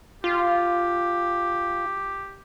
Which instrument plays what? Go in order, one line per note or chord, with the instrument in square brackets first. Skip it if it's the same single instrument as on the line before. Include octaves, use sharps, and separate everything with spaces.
[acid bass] F4 [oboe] G4